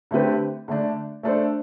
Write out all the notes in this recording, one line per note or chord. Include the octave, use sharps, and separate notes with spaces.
D3 A3 C4 G4 B4
D3 A3 D4
A3 D4 A4 C5